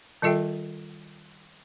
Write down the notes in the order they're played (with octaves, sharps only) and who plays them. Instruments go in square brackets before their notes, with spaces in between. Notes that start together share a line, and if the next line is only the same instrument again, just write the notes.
[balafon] D#3 G3 F4 A4 E5 G5